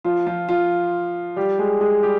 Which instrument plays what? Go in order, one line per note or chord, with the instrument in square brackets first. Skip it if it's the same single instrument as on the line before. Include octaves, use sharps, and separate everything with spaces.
[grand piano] F3 F4
F3 F4
F3 F4
G3 G4
G#3 G#4
G#3 G#4
G3 G4